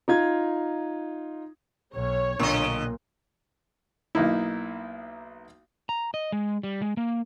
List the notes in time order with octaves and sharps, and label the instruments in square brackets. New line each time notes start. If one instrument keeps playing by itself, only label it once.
[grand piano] D#4 F4 G#6
[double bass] B1 [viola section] C#5
[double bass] B1 [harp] A#2 A#3 [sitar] D3 D#5
[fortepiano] B1 A#3 D#4 E4
[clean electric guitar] A#5
D#5
G#3
G3
G#3
A#3